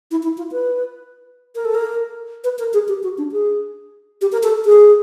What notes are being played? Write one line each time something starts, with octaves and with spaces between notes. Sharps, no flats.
E4
E4
F4
B4
A#4
A4
A#4
B4
A#4
G#4
G4
F#4
D4
G#4
G4
A#4
A4
G#4